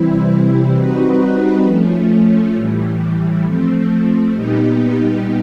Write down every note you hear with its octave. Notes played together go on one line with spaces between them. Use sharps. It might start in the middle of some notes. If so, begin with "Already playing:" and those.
Already playing: C3 E3 G3 C4 E4
G3 C4 D#4 F#4 B4
F3 A3 C#4
A2 E3 G3
F3 A3 C4
A#2 G3 B3 D#4 G4